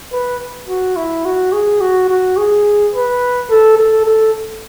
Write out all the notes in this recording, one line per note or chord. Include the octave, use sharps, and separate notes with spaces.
B4
F#4
E4
F#4
G#4
F#4
F#4
G#4
B4
A4
A4
A4